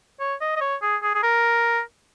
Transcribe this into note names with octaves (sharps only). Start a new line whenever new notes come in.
C#5
D#5
D#5
C#5
G#4
G#4
G#4
A#4